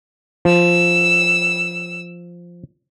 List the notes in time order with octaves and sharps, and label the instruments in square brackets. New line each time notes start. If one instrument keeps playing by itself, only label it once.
[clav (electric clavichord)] F3 [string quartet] E6